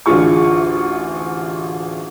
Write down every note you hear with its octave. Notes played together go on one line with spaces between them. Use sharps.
A1 D2 D4 F4 G#4 C#6